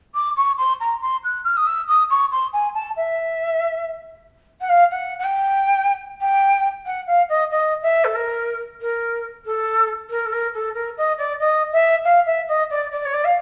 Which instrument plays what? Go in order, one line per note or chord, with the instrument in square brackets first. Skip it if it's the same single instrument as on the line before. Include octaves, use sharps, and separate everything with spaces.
[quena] D6
C#6
C6
A#5
C6
F#6
F6
D#6
E6
D#6
C#6
C6
G#5
A5
E5
F#5
F5
F#5
F#5
G5
G5
F#5
F5
D#5
D#5
E5
A4
A#4
A#4
A4
A#4
A4
A#4
A4
A#4
D#5
D5
D#5
E5
F5
E5
D#5
D5
D5
C#5
D5
F5